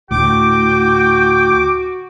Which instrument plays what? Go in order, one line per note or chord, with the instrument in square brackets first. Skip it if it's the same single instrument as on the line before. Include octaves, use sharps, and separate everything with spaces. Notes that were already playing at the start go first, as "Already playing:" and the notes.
[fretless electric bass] D2 A2 [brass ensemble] F#4 [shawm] G5 [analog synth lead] D6